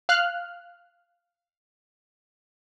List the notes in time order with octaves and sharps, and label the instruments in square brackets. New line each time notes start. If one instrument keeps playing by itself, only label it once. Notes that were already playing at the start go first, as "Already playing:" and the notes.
[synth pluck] F5 F6 F#6